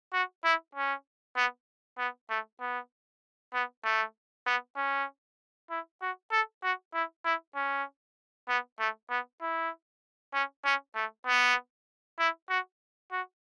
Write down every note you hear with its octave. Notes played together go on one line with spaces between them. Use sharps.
F#4
E4
C#4
B3
B3
A3
B3
B3
A3
B3
C#4
E4
F#4
A4
F#4
E4
E4
C#4
B3
A3
B3
E4
C#4
C#4
A3
B3
E4
F#4
F#4